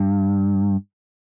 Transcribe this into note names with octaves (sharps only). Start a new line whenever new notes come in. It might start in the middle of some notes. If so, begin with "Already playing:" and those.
Already playing: G2